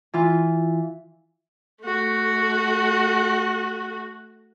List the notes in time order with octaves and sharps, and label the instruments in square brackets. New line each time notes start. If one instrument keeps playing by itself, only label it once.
[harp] E3 F4
[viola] A3 F#4